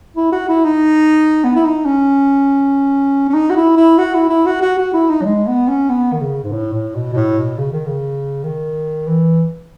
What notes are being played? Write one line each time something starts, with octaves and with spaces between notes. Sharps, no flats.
E4
F#4
E4
D#4
B3
E4
D#4
C#4
C#4
D#4
F#4
E4
E4
F#4
E4
E4
F#4
F#4
F#4
E4
D#4
F#3
G#3
B3
C#4
B3
D#3
C#3
G#2
A2
A2
B2
B2
A2
B2
C#3
D#3
C#3
D#3
E3